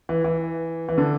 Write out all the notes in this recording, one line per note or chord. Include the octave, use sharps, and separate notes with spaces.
E3
E3
E3
D3